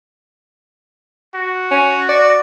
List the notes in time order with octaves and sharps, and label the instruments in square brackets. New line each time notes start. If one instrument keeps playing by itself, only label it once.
[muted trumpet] F#4
[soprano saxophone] C#4
D5